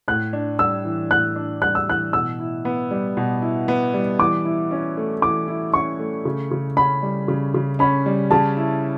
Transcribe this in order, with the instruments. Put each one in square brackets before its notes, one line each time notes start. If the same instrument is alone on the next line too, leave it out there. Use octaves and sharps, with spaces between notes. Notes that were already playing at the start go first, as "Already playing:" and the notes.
[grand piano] A2 [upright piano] F#6
[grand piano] D4
[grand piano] G3 [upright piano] E6
[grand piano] E3
[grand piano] A2 [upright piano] F#6
[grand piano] D4
[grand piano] G3 [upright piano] F#6
[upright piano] E6
[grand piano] E3 [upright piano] F#6
[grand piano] B2 [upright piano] E6
[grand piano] E4
B3
G3
B2
E4
B3
G3
[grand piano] E3 [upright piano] D6
[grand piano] E4
C#4
A3
[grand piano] E3 [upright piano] D6
[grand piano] E4
[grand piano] C#4 [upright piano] C#6
[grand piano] A3
C#3
C#3
[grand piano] C#4 [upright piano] B5
[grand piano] G3
C#3
C#3
[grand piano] C#4 [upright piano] B5
[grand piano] G3
[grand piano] C#3 [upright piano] A5
[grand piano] E4